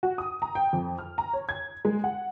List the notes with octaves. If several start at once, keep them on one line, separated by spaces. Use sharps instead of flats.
F#4
D#6
A#5
G5
F2
F6
A#5
C#5
G#6
G#3
F#5